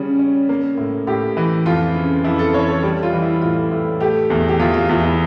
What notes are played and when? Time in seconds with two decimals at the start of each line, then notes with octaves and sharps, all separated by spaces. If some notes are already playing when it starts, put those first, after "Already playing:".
Already playing: C#3 G3 C#4
0.19 C#4
0.49 A#3
0.78 A2
1.07 A2 G4
1.37 E3
1.65 F2 F4
1.95 C#3
2.24 F2 E4
2.39 A4
2.54 E3 C#5
2.68 A4
2.83 G3 A4
3.03 F4
3.13 E3
3.22 E4
3.42 A2 F4
3.71 A2
4.00 A3 G4
4.30 E2
4.49 G4
4.59 E2 F4
4.74 F4
4.89 E2 F4
5.03 E4